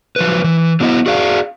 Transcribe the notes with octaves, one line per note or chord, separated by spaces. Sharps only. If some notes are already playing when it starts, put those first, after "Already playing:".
F3 F#3 B4
E3
F#3 B3 E4 D#5
F#4 G#4 D5 F5